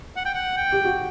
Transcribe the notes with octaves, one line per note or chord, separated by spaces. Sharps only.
F#5
G5
F#5
G5
G4
F#4